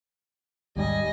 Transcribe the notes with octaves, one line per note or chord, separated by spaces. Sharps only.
D#2 G#2 G3 D#5 G#5